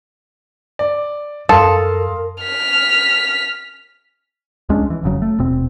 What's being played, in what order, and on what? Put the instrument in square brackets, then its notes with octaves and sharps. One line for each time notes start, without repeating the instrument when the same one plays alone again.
[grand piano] D5
[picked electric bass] F#2 G3 [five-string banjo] A4 [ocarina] A#4 [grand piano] F5 C6 D#6
[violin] F6 B6
[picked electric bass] C#2 G#3 C#4 D4
E3
F1 C#3 F#3
A3
D#1 B2 C4